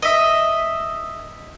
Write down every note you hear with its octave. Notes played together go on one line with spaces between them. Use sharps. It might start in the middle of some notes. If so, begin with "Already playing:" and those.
D#5 E5